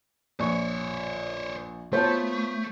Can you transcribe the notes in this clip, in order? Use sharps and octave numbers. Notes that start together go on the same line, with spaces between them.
A#1 C5 C#5 C#6
A3 B3 F4 C5 C#5 A5 G6